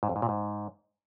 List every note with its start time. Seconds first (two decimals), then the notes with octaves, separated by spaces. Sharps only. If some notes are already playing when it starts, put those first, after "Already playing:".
0.03 G#2
0.09 F2
0.16 G#2
0.22 A#2
0.29 G#2